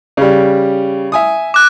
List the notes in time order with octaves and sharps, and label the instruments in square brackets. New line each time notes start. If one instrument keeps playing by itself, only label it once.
[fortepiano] C#3 G3
E5 G#5 D#6
[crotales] D6 F#6